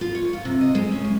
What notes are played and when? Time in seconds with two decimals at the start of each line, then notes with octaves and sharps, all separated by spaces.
0.01 F4
0.15 C#5
0.33 F4
0.45 C3
0.61 D#5
0.75 G#3
0.92 C#4
1.04 A2